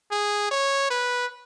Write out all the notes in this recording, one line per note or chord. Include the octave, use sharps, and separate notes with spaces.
G#4
C#5
B4